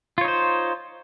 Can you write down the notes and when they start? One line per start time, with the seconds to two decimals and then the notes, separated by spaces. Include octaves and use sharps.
0.18 F4
0.21 C#5
0.25 D#4
0.28 C5